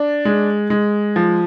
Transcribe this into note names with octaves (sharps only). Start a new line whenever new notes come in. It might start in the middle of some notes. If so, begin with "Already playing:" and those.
Already playing: D4
G#3
G#3
F3